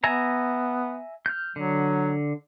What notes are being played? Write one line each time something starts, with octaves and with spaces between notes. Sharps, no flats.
B3 E5 G#5 A#5
F6 G6
D3 F#3